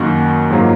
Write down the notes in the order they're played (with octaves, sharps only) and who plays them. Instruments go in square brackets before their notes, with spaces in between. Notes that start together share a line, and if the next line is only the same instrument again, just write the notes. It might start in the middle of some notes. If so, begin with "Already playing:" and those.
Already playing: [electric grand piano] F#2 D#3 A#3 D#4 F#4
G#2 F#3 A#3 F4